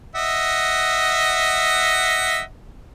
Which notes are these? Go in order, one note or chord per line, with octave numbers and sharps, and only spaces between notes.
D#5 E5 F#5